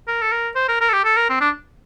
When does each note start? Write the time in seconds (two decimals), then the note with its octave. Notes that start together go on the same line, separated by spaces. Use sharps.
0.07 A#4
0.22 A4
0.31 A#4
0.55 C5
0.68 A#4
0.81 A#4
0.89 A4
0.93 G4
1.04 A4
1.16 A#4
1.29 C4
1.41 D4